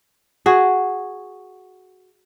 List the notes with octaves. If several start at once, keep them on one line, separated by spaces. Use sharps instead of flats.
F#4 G#4